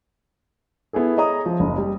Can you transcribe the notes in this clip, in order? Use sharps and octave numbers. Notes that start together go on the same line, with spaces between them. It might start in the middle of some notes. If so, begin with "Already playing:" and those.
B3 E4 G#4 A4
G#4 C#5 D#5 A#5 D#6
F3
F#1
G3